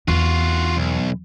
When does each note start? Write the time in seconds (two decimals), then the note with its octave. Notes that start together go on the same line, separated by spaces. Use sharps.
0.08 E2 F4 F#4
0.77 B1